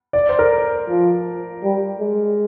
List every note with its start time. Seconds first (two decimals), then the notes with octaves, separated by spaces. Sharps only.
0.13 D5
0.29 C5
0.39 A#4
0.89 F3
1.63 G3
2.00 G#3